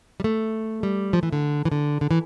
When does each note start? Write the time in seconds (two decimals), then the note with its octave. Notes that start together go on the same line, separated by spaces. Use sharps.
0.20 G3
0.24 A3
0.83 G3
1.13 F3
1.23 E3
1.33 D3
1.65 E3
1.72 D3
2.01 D3
2.11 E3